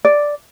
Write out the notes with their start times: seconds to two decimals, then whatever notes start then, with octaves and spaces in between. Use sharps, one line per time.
0.05 D5